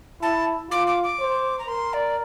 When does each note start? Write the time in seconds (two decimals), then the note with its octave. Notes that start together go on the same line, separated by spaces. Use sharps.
0.22 E4 A5
0.71 F4 D6
0.87 D6
1.03 D6
1.20 C5
1.59 A#5
1.68 A#4 C6
1.93 D5